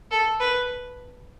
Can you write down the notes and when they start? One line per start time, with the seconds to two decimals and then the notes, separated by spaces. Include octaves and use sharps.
0.11 A4
0.40 B4